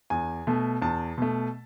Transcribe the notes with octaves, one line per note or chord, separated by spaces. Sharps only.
E2 G#5
B2 A3
E2 A5
B2 A3